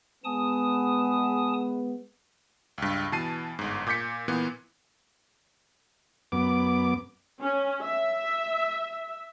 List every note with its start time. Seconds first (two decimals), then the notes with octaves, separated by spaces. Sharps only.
0.24 G#3 B3 G#5 A5 D#6
2.78 C#2 G2
3.12 B2 E3 A5 C7 D#7
3.59 G1 G#2
3.87 A#2 D6 G6 B6 C#7
4.28 A#2 E3 B3
6.32 F#2 B3 D6
7.41 C#4
7.82 E5